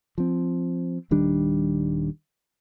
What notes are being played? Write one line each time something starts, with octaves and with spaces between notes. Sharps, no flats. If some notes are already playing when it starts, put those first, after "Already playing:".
F3 C4
D#1 D#3 G3 D4